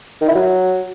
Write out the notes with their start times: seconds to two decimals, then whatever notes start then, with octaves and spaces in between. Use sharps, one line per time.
0.21 D#3
0.28 E4
0.35 F#3